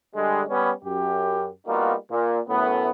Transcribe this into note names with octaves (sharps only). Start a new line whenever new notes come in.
D3 G3 G#3
G3 B3 C#4
F#2 G4
G3 A#3 B3 D#4 F4 F#4
A#2
F#2 A2 A3 B3